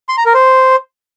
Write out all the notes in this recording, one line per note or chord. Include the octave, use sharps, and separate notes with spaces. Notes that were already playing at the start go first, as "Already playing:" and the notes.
C6
A#5
A#4
C5